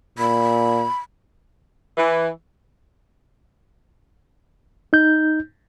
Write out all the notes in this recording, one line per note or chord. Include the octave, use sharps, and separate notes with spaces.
A#2 B5
E3
D#4 G6